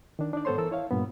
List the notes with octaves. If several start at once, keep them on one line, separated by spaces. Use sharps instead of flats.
D#3 D4
D4 D#4 D5
G#2 B3 A4 C5 C#5 C6
E3 A4 A#4 E6
E4 C#5 F5
G2 A#2 B3